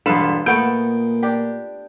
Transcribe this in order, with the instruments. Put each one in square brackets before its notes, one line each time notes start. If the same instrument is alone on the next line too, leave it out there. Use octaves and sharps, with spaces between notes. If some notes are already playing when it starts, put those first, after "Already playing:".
[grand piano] E1 C6 E7 [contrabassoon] G2 [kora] F4 A4 B4
[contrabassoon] A#2 [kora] A3 B3 A4 [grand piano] G6 D7
[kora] D4 G4